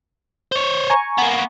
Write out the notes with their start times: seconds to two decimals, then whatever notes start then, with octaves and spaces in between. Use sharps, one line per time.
0.52 C5 C#5
0.90 G#5 A#5 C#6
1.18 A#3 B3